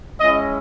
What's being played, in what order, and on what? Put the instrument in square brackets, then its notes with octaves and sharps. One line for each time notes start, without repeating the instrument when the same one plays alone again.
[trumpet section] G#3 C#4 E4 D#5